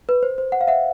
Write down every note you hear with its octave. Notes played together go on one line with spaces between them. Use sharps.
B4
C5
C5
F#5
F5
E5 F#5